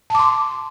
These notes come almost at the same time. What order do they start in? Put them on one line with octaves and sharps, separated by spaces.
A5 D6 C6